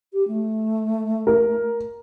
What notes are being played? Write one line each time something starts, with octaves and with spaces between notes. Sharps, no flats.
G4
A3
A#4